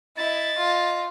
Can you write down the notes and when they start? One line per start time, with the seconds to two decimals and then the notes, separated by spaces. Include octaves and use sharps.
0.17 E4 D#5 A6
0.58 F4